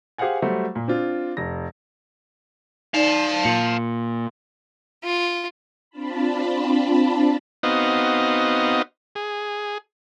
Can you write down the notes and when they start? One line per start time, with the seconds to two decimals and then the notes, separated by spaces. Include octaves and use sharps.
0.18 G4 G#4 C5 F5 F#5 G#5
0.42 F#3 G3 A3 C5
0.75 A#2
0.88 C4 D4 F4
1.37 F1 A#6
2.94 D#4 D5 F5 A5
3.45 A#2 C#7
5.04 F4
5.90 C4 D4 F4 A5 B5
7.63 B3 C4 D#4 F#4 D#5 F5
9.15 G#4